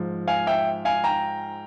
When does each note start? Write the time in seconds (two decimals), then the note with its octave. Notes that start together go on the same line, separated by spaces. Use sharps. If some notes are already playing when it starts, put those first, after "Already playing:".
Already playing: G#2 F3
0.27 F5 G#5
0.47 E5 G5
0.85 F5 G#5
1.04 G5 A#5